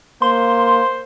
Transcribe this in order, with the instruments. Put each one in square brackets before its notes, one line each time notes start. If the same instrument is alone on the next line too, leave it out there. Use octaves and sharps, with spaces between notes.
[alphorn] A#3 [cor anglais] C5 [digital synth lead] C6